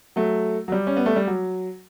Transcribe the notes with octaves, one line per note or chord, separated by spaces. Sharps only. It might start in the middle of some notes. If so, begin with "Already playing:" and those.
F#3 A3
F#3
G3
C#4
B3
A3
G3
F#3